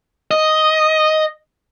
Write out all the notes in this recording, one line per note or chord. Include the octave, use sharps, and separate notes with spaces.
D#5